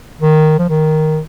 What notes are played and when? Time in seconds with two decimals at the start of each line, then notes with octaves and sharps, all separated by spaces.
0.21 D#3
0.59 F3
0.69 D#3